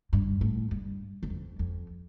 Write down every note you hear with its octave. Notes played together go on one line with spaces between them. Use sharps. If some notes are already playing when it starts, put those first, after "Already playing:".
G2
A2
G2
E2
F2
F2